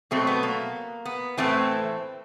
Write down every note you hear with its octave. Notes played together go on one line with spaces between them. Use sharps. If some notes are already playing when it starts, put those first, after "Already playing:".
B2 F#3 A3 C4
B3
A#3
B3
A2 E3 A3 C4